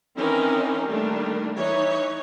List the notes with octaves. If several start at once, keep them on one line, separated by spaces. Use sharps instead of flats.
D#3 E3 C4 C#4 D#4 A#4
D#3 G3 A3 A#3 D4
E3 D#4 C#5